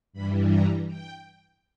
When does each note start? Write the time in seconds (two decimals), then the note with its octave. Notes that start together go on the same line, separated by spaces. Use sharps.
0.13 G2 E3 G3 B5
0.50 A#5
0.87 G5